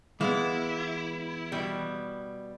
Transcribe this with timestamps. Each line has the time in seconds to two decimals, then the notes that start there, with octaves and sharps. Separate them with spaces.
0.21 E3 G#3 B3 E4 F5
1.52 B2 G3